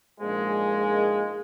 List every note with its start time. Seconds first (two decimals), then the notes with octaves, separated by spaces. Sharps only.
0.20 A#1 G#2 F3 G#3
0.90 A#3